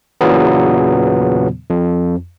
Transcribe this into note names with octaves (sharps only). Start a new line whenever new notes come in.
E2 A#2 C#3 E3 F#3 B3
F2